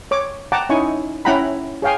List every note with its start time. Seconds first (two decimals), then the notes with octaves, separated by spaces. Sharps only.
0.11 C#5 D6
0.52 F#5 G5 A5 A#5 D6
0.69 C#4 D#4 E4 G#5 C#6
1.25 C#4 E4 F#5 G5 A#5 B5
1.82 G#4 C#5 F5 G5 G#5